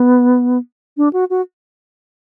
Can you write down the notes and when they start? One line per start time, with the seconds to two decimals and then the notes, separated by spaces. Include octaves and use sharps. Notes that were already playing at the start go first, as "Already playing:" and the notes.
Already playing: B3
0.97 D4
1.13 F#4
1.30 F#4